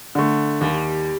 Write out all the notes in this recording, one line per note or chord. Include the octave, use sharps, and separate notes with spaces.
D3 A3
D#2 G3